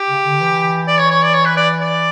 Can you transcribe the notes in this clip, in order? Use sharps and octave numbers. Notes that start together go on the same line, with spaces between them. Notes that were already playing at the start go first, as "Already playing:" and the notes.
Already playing: G4
C#3
D3
E3
D5
C#5
C#5
D5
C#5
B4
D5
D5